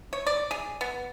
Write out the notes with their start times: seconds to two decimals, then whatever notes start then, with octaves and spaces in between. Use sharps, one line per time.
0.13 C#5
0.27 D5
0.51 G#4
0.81 B3